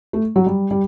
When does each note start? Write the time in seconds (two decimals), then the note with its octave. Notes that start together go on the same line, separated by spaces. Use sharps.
0.13 A3
0.36 F#3
0.46 G3
0.71 G3